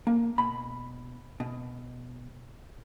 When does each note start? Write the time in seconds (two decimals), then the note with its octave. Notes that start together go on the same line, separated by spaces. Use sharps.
0.07 A#3
0.38 B2 B5
1.40 B2